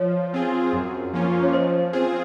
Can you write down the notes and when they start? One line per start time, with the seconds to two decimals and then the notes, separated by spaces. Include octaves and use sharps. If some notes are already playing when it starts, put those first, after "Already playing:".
Already playing: F3 C#5 F5
0.34 C4 F4 G#4
0.73 F#2
1.14 F3 A#3 C#4 F4
1.43 C#5
1.53 F3 C5 D#5
1.93 C4 F4 G#4 C5